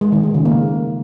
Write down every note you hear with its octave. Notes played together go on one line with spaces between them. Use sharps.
G#3
D#3
A3
C#3
A#3